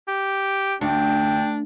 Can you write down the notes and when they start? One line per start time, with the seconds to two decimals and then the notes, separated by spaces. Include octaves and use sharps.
0.08 G4
0.81 D2 D4 G5